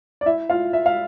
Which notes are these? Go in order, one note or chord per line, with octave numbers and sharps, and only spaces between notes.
D5
E4 E5
F4 F5
E5
F5